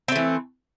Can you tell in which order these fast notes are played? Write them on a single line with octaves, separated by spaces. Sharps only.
C4 A3 E3